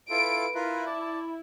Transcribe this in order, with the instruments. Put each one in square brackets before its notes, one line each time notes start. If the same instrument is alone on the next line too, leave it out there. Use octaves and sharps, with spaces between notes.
[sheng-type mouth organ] E4 F4 A4 [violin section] B4 D7
[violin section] E4 [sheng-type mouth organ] F4 A#4 B4
[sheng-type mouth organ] D5 A5